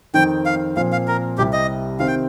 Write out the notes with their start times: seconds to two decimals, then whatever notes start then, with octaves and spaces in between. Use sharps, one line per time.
0.14 F2 D#3 C4 D#4 G5
0.46 F5
0.77 A#2 F3 C4 F5
0.92 F5
1.08 A#4
1.38 C2 C3 G3 G4
1.53 D#5
2.00 C3 D#3 C4 F5
2.07 G5